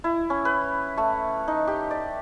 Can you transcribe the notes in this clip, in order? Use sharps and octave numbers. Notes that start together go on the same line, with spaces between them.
E4
C#4
B4
A3
D#4
G4
D5